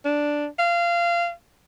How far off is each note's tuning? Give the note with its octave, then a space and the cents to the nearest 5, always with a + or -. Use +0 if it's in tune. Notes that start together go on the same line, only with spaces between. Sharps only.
D4 +0
F5 -20